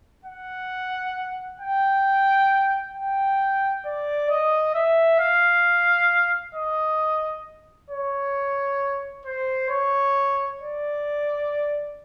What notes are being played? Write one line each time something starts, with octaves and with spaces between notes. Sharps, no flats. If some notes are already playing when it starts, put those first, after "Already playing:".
F#5
G5
G5
D5
D#5
E5
F5
D#5
C#5
C5
C#5
D5